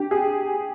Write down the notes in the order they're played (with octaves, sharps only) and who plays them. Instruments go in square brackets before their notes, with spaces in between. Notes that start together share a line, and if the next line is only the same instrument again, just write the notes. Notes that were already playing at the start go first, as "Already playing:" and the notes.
Already playing: [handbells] D4 [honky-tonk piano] G4
[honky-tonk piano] G#4